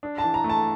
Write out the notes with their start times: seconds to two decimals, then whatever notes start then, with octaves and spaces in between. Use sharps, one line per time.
0.03 D4
0.18 A5
0.24 E3
0.34 A#5
0.44 A3
0.49 A5